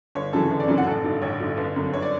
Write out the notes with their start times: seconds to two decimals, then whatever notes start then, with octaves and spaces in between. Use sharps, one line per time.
0.15 G1 C#5
0.33 F#2 C#3 E3 A4
0.51 G1
0.60 D5
0.68 F#2 C#3 E3
0.78 F#5
0.87 A1 A4
1.04 G2 D3
1.22 A1 C#5
1.40 G2 D3
1.57 G1
1.76 F#2 D3
1.93 G1 C#5
2.02 D5